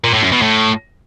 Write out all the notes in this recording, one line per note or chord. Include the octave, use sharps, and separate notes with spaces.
A#2
A2
F#2
B2
A2